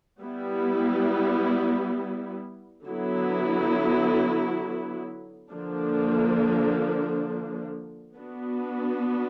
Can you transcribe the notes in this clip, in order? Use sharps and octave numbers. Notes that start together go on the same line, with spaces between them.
G3 B3 E4
D3 F#3 B3 E4
D3 F3 A#3 D4
B3 D4 F#4